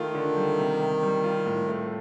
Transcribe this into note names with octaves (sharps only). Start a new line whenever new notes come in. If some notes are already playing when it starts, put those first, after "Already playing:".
Already playing: D#3 A3 F4
D3
G3
C3
C3
G3
F4
A2
A3